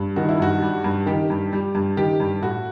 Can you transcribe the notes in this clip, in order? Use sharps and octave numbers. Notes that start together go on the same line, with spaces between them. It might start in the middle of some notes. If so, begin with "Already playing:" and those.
Already playing: G2
D#3 F#4
E4
G2 F#4
G3
G2
D#3 G4
G2
G3
G2
D#3 G4
G2
A2 F#4